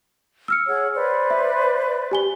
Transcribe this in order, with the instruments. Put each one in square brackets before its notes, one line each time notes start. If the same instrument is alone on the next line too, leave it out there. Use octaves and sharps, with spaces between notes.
[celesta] E6 F6 C#7
[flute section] G#4 C#5 F#5
B4 C5 D5
[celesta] E5
G4 G#5 G7